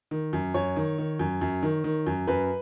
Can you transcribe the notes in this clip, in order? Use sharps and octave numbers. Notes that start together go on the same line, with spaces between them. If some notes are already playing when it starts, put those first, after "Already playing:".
D#3
F#2
F#2 C#5
D#3
D#3
F#2
F#2
D#3
D#3
F#2
F#2 B4